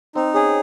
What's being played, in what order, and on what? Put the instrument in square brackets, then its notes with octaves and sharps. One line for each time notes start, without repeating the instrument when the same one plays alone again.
[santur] C4 [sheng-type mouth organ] D#4
[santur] C#4 [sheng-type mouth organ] G#4